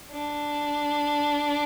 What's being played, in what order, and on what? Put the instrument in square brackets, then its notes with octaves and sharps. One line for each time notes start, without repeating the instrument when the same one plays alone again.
[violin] D4